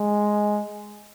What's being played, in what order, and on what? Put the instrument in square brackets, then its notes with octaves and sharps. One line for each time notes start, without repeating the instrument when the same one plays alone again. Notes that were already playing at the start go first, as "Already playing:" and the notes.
Already playing: [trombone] G#3